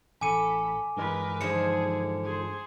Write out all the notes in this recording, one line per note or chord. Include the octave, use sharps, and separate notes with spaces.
A1 A4 G#5 B5 D6 C#7 D#7
G2 E3 G#3 A#4 B4
D3 F3 D#4 G#4 C#7
G#4 C5